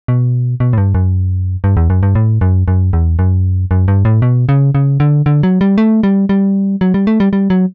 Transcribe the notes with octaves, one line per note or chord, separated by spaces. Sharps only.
B2
B2
A2
G2
F#2
G2
E2
F#2
G2
A2
F#2
F#2
E2
F#2
F#2
G2
A2
B2
C#3
C#3
D3
D3
F#3
G3
A3
G3
G3
F#3
G3
A3
G3
G3
F#3